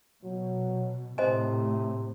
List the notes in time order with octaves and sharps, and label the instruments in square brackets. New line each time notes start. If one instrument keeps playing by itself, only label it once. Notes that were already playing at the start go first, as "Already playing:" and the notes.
[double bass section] B2 [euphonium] F#3
[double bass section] A2 [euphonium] C3 [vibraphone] C4 [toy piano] C5 D#5 G#5